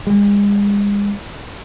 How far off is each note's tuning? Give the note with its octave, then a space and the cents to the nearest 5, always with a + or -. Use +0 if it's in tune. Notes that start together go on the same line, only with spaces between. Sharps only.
G#3 -40